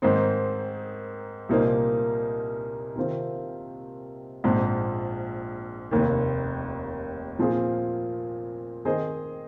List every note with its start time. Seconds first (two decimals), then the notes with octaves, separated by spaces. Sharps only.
0.02 G#2 D#3 C4 D#4 C5
1.49 C2 A#2 A#3 D#4 C5
2.96 C3 D#3 C4 F4
4.44 A#1 G#2 F3 C4
5.91 F1 D#2 D#3
7.39 A#2 F3 C4 F4 G#4
8.85 D#3 C4 G#4 C5 D#5